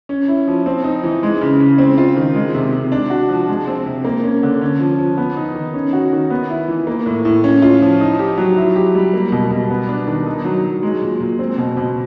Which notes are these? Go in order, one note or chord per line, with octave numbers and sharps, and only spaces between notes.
C#4
E4
F3
C4
D#4
E3
G#3
C#3
C#3
C4
F4
D#3
G#3
C3
C3
D4
F#4
F3
G#3
C4
C3
A#3
C#4
D3
C#4
F3
F3
B3
D#4
D#3
C#4
F#4
D#3
B3
E4
E3
A#3
A2
A2
C#4
F4
F3
D#4
G4
F#3
E4
G4
G3
A#3
B2
B2
B3
D4
D#3
D#4
F#3
F#3
G#3
A#2
A#2
C4
B2
B2